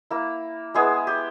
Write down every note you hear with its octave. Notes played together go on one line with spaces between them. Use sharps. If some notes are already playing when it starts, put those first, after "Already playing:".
A#3 E4
G#3 B3 E4 G#4
G4